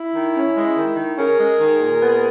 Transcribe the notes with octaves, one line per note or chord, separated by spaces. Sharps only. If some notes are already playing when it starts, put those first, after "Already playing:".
Already playing: E4
D#3
C#4
G#3
D#3
D#3
C#4 G#4 A#4
G#3
D#3
A#2
B3